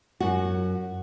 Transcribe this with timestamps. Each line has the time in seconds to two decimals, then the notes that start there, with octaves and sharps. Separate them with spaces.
0.20 F#2 F#4